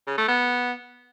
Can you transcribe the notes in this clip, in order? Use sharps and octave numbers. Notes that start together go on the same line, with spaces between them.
C#3
A3
B3